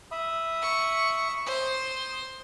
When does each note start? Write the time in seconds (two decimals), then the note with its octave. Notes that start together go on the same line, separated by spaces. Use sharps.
0.11 E5 B5 D#6
0.62 C#6
1.46 C5 D#6